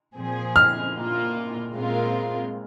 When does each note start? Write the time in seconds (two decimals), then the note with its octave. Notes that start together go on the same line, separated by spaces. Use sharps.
0.17 A#2 F3 C4 G#4
0.56 F6
0.95 A#2 A#3 F4
1.73 A#2 G#3 C4 F4 A#4